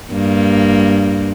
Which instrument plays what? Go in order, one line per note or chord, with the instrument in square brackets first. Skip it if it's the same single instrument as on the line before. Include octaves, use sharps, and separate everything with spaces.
[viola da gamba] G2 A#3